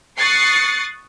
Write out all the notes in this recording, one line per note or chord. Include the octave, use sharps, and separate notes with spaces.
C#6 D#6 F#6 A6 C7 C#7